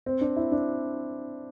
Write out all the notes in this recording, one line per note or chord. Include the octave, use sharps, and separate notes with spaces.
C4
D4
E4
D4